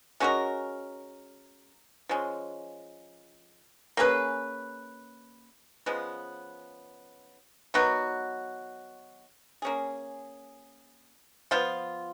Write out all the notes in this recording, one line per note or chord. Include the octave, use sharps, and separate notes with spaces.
G#3 C#4 F#4 A#4
F3 G#3 C#4
A#3 C#4 G#4 B4
C#3 F3 G#3 B3
D#3 F#3 B3 F#4
A#3 C#4 G#4
F3 B3 F4